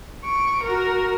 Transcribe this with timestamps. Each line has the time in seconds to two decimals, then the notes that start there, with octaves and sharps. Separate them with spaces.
0.24 C#6 D7
0.63 F#4 A#4